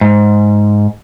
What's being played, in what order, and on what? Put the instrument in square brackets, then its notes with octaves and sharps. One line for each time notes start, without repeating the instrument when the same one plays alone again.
[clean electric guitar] G#2